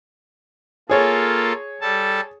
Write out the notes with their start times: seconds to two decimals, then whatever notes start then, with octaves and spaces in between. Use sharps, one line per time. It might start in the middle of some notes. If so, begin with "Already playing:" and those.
0.89 A#3 F4 G#4 A4 C#5
1.81 G3 A4 A5